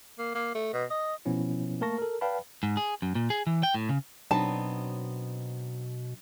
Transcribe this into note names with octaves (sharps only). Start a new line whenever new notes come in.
A#3
A#3
A3
B2
D#5
B2 F3 B3 C#4 E4
A3 A#3 A#4 A5 C#6 A#6
A4 A#4
B4 D5 F5 G5 A5 B5
G#2
G#4
F#2
A#2
G#4
E3
G5
A2
C#3
B2 F#3 B3 C4 D4 D#4 C#5 A5